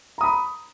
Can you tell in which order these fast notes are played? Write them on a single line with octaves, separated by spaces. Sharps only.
A#5 D#6 B5